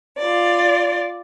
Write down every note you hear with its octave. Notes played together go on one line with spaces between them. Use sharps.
F4 D5